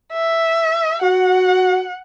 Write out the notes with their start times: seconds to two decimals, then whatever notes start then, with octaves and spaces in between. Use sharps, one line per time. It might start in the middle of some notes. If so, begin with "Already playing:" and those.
0.13 E5
1.02 F#4 F#5